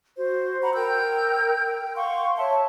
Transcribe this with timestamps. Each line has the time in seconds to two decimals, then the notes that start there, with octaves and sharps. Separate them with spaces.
0.17 F#4 C5
0.61 F#5 A#5 B5
0.74 A#4 G5 E6 G6
1.65 G5
1.96 F5 F#5 C6 C#6
2.37 C#5 E5 A5